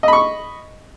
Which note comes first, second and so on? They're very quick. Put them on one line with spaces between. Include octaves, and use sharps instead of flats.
D#5 B5 C#6